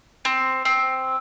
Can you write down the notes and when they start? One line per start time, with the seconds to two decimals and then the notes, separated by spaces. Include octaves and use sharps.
0.25 C4
0.65 C4